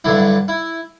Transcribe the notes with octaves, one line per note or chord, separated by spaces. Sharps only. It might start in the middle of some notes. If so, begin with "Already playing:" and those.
G2 D3 F#3 E4
E4